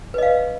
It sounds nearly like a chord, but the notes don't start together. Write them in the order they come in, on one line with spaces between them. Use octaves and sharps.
B4 D#5 F5